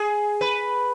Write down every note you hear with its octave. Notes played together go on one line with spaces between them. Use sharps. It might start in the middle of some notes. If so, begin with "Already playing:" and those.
Already playing: G#4
B4